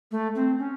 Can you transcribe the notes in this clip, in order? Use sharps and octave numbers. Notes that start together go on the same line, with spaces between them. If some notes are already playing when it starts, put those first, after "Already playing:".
A3
C4
C#4